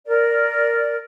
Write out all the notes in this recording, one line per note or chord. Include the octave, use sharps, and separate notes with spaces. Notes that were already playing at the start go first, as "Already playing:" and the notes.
A#4 D5